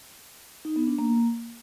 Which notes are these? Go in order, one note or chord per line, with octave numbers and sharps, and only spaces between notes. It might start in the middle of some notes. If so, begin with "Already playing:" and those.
D#4
B3
D4
A#3